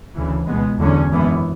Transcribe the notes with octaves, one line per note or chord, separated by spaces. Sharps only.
D2 C#3 E3
C#2 B2 G#3 B3
E2 D3 F#3 C#4
G#1 F#2 E3 B3